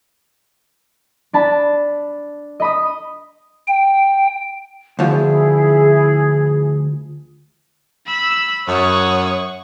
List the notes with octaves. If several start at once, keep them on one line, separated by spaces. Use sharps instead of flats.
D4 A5 B5
D#5 B5 D#6
G5
D2 F3 E4 G#4
B5 E6
F#2 C#5 F#5 C#6 D#6